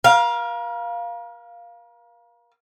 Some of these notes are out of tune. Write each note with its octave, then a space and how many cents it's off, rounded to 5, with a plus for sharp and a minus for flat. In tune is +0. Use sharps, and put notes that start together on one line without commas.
A#4 +40 F5 +0